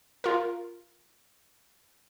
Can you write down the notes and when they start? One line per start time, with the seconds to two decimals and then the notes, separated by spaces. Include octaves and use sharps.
0.24 F4 A#4